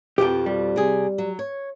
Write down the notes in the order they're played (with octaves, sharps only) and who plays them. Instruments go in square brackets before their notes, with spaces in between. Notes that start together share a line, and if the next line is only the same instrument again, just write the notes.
[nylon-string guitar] F2 B2 F3 [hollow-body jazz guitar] G4 G5
[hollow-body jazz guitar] G3
[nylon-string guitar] C3 G#4
F#3
C#5